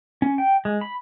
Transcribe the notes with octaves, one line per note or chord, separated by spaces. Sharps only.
C#4
G5
G#3
B5